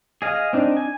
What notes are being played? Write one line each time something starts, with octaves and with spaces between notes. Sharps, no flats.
G#4 D#5 F5
C4 D4 D#4
G#5